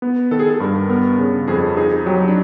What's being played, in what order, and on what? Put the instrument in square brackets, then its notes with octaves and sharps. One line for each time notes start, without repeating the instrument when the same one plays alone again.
[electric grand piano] B3
[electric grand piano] D#3 [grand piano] A4
[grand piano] G#4
A4
[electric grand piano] G2 [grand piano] A#4
[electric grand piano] B3 [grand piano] A#4
[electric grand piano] C#3
[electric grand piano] F2 [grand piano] G#4
[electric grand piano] D#4 [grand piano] G#4
[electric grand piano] F#3 [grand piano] G4
[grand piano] D4